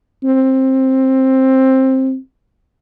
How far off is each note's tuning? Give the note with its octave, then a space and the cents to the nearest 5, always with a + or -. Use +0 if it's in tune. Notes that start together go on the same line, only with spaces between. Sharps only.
C4 +15